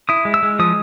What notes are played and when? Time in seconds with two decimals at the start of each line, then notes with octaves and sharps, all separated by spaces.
0.09 E4 D#6
0.25 G#3
0.34 E6
0.43 G#3
0.59 F3 D#6